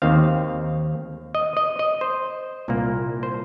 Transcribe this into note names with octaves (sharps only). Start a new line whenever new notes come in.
D#2 D#3 C4 F5
D#5
D#5
D#5
C5
C2 A#2 A#3
C5